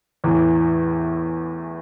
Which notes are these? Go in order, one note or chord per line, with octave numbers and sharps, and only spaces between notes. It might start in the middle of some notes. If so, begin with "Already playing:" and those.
E2 A2 E3